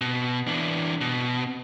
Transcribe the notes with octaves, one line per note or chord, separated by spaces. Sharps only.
B2
E3 D4
B2